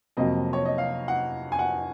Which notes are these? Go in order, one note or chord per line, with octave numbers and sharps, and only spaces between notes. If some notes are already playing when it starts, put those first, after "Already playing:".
F2 C3 F#3 A#3 D#5
C#5
D#5
F5
F#5
G#5
F#5